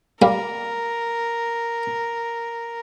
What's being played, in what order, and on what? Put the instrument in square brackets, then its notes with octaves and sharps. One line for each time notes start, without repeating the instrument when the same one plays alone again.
[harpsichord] G3 A#3 [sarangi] A#4